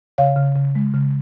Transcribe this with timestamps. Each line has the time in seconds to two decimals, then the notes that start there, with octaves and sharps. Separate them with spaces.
0.18 C#3 C#5 F5
0.36 C#3
0.56 C#3
0.75 G#3
0.94 C#3